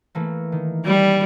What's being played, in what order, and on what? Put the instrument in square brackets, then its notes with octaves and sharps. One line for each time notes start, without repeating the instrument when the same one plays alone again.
[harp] E3 A3 A#3
D#3
[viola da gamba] G3 [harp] B5 D#7